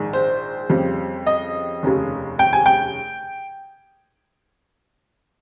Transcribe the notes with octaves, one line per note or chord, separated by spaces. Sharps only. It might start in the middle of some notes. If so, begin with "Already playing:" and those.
Already playing: A#1 G#2 D#3 G#3
C5
F2 C#3 G3
D#5
F1 D#2 C#3
G5
G#5
G5